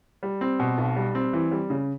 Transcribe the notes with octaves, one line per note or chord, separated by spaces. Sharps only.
G3
C4
B2
B1
G3
C4
E3
G3
C#3